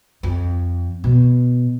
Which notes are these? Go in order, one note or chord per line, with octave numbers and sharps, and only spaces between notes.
F2
B2